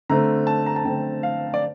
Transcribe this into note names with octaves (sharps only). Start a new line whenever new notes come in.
D3 A3 C4 A#5
A5
A#5
A5
D3 A3 C4 G5
F5
D5